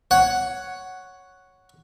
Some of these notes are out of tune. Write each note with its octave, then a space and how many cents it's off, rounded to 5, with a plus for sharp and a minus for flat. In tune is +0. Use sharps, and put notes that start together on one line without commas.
C#5 +0 F#5 +0